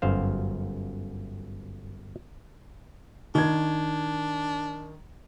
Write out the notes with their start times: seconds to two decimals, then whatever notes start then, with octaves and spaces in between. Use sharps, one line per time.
0.02 G1 F#2 C5 F5
3.35 D#3 D4 G#6